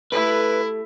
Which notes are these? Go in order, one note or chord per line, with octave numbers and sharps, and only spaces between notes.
A3 E4 G4 A4 B4